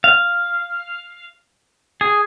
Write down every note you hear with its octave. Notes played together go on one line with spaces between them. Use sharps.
F5
G#4